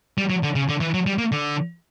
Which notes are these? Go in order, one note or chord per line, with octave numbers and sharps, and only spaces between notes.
G3
F#3
D3
C#3
D3
E3
F#3
G3
A#3
D3